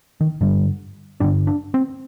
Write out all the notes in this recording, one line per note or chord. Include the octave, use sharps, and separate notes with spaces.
D#3
G2 D3 G3
G2 D3 D4
D4
C4